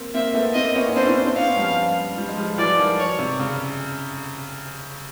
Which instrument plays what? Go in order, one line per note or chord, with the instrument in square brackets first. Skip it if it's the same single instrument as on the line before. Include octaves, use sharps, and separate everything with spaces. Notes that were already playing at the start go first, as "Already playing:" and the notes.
Already playing: [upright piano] A#3 C4
[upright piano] A#3 C4 [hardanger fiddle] E5
[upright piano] A3 B3
[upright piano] A#3 C4 [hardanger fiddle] D#5
[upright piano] B3 C#4
C#4
[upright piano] C4 D4 [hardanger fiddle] C5
[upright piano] D4 E4
C4 D4
[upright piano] B3 C#4 [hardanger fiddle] F5
[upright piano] F3 G3
F3 G3
G#3
F3 G3
[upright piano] E3 F#3 [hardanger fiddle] D5
[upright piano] D#3 F3
[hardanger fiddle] C#5
[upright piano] C3
C#3